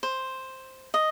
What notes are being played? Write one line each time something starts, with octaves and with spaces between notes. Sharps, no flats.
C5
D#5